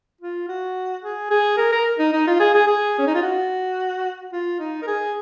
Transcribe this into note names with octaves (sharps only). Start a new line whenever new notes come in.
F4
F#4
G#4
G#4
A#4
A#4
D#4
D#4
F4
G#4
G#4
G#4
C#4
D#4
F4
F#4
F4
D#4
A#4
G#4